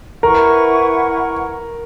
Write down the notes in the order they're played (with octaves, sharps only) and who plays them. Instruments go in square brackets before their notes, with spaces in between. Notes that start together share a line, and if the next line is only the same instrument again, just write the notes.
[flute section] E4 B4 F#5 C#6 [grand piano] A#4